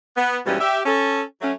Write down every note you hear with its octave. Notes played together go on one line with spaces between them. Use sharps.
B3
D#2 G#2 B2 E3 G3 C#4
G4 E5
C#4 A4
F#3 A3 C#4